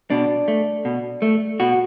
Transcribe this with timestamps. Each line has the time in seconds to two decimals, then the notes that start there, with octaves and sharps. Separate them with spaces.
0.10 B2 D4
0.48 A3
0.85 B2
1.22 A3
1.60 B2 F#4